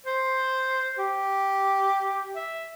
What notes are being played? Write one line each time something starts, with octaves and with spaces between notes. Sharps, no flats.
C5
G4
E5